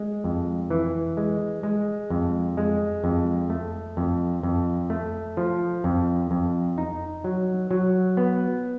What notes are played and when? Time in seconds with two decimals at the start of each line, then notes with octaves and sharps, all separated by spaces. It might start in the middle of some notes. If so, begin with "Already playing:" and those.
Already playing: G#3
0.24 F2
0.70 E3
1.17 G#3
1.63 G#3
2.10 F2
2.57 G#3
3.04 F2
3.50 A3
3.97 F2
4.43 F2
4.90 A3
5.37 F3
5.84 F2
6.31 F2
6.78 D#4
7.24 F#3
7.71 F#3
8.17 B3